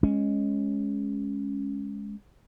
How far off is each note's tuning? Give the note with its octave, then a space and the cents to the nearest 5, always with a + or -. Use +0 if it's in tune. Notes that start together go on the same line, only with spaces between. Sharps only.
G#3 +0 C#4 +0